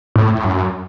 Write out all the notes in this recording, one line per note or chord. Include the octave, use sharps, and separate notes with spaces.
A2
A2
F#2